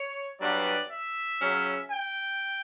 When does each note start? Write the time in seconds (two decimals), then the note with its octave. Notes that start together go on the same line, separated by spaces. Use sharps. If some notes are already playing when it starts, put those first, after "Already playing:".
Already playing: C#5
0.40 G2 F#3 B3 D4 D5
0.91 E5
1.40 C#3 F#3 C#4
1.90 G5